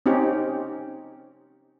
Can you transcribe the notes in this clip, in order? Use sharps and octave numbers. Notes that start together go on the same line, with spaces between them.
C4 C#4 D#4 G4